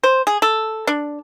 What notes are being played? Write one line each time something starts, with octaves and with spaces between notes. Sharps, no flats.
C5
G#4
A4
D4